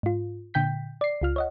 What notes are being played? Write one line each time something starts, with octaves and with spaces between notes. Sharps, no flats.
G#2 F4
A#2 D3 G5 G6 B6
D5 C7
C#2 F4 F6
C#5 D#5 F#5